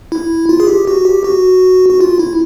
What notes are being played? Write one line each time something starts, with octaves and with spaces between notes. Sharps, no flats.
E4
F4
G#4
G4
F#4
G4
F#4
F#4
F4
E4